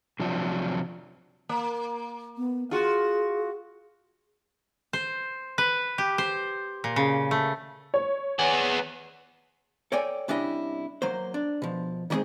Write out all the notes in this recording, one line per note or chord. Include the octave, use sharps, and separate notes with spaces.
C3 F3 F#3 D4
A#3
B3
F4 F#4 G#4
C5
B4
G4
C5
A#2
C#3
A3
C#5
B3 G#4
A4 C#5 D5 G5 G#5
C2 C#4 D4 E4 G4 D#5
F#3 A#3 C5
D4
B2 F3
D#3 G3 G#3 C4 G#4 C5